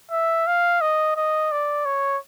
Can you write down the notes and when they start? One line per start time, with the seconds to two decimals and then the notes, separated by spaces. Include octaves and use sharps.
0.11 E5
0.47 F5
0.81 D#5
1.17 D#5
1.52 D5
1.86 C#5